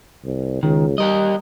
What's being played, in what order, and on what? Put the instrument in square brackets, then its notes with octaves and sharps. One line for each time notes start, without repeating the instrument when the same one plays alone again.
[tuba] C2
[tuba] C#2 [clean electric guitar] D#3
[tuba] G3 [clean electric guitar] G4 A#4 D#5